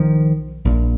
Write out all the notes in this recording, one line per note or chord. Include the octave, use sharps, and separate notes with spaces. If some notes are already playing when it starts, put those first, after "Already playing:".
Already playing: B1 D#3 F3
A#1 A#2